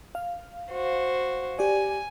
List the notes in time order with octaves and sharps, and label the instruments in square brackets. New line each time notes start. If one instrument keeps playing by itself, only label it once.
[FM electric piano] F5
[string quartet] F#4 C5
[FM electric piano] G4 D5 [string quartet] G#5